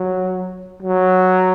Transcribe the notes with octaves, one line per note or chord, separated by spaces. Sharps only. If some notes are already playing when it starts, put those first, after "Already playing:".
Already playing: F#3
F#3